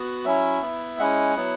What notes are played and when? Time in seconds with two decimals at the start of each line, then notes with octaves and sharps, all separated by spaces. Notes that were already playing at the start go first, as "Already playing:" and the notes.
Already playing: B3 F#4
0.25 F#3 C#4 E4 E5
0.61 B3 E4
0.99 G#3 C#4 E4 F#5
1.36 F#3 B3 E4